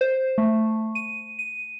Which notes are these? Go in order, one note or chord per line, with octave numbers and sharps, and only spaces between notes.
C5
A3
D#7
D#7